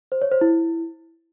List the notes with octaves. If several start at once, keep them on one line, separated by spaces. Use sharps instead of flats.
C5
C#5
C5
E4